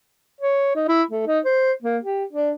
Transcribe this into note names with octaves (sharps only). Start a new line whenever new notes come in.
C#5
D#4
E4
A3
D#4
C5
A#3
G4
D4